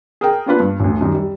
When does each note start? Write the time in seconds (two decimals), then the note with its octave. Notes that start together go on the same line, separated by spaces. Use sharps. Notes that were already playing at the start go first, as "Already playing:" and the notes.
0.21 G#4 A#4 G5
0.46 A#3 B3 D4 F4 B4
0.60 G2
0.80 A1 D2
1.01 F#2 D#3 G3
1.15 G3